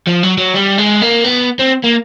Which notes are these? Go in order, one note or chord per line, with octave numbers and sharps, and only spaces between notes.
F3
F#3
F#3
G3
G#3
A#3
B3
C4
A#3